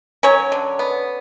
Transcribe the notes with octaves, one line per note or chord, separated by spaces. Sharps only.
F#3 C#4 C#5
D3
B3